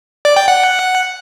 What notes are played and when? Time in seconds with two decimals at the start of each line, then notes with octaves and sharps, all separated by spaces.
0.25 D5
0.36 G5
0.48 F#5